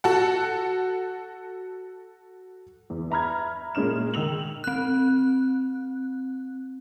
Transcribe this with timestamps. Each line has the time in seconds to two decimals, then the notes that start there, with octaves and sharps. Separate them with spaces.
0.04 F#4 A4 F#5
2.90 E2
3.11 E5 A#5 B5 F6 G#6
3.75 A#2 G#3 C#4 F6 E7
4.14 D#3 E6 F7 F#7
4.64 C4 F#6